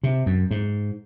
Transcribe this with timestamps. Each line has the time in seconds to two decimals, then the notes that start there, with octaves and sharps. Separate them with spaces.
0.03 C3
0.26 F#2
0.51 G#2